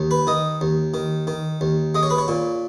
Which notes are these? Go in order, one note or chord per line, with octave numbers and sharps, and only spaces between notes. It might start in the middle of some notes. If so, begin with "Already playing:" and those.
Already playing: D#2
B4
D#3 D#5
D#2
D#3
D#3
D#2
G#3 D#5
C#5
B4
C#5
A#2